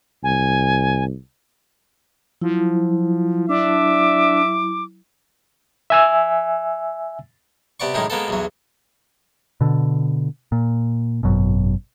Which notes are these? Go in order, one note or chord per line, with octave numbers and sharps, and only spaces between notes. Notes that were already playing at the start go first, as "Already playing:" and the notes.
C2 G#5
F3 F#3 E4
D4 E5 D6
E5 G#5 E6
C3 B3 D5 C#6
F#2 A2 D#3 G#3 D#4
G#3 A#3 B3 A4
B1 E2 F#3
B2 D3
A#2
G#1 F#2 B2